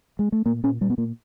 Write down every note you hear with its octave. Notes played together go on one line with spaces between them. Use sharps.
G#3
A3
A#2 A#3
A#2 C#4
A#2 G3
B3
A#2 A#3